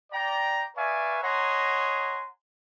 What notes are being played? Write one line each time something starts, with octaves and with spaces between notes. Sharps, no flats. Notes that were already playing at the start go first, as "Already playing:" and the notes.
D5 G5 A#5
B4 D5 E5 F5 G#5 C#6
C#5 D#5 F#5 G#5 A#5 C6